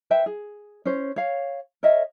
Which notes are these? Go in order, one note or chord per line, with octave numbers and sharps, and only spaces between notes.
B4 C5 E5 G5
G#4
C#4 C5 C#5
C#5 F5
A#4 C#5 D#5 E5